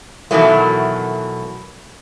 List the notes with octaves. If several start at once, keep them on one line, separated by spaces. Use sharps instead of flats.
B2 D#3 E3 F#3 A3